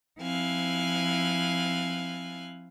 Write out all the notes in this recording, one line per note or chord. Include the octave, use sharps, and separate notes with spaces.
F3 C4 E4 F5 G#5 F#6